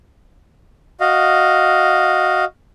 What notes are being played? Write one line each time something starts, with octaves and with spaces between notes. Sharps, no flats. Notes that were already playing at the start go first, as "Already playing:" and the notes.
F#4 D#5 F5